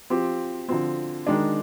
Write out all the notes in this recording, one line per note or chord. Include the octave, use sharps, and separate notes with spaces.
F3 C4 G4
D3 F3 C4
D#3 G#3 D4